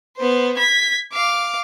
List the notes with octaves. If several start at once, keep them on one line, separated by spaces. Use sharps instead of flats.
B3 C5
G#6 B6
F5 D6